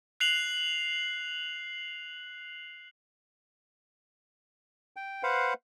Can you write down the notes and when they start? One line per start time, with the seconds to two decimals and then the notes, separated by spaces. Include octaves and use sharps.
0.20 F#6 C7 F7 F#7
4.96 G5
5.23 B4 C5 F5 F#5